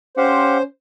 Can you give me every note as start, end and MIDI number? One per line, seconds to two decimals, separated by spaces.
0.17 0.64 61
0.17 0.58 67
0.17 0.63 72
0.17 0.58 77
0.17 0.58 78